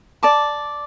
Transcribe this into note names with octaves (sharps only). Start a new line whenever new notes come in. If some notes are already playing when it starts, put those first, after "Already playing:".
D5 A5 D6